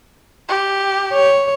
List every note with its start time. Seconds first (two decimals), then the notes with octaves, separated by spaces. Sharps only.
0.48 G4
1.13 C#5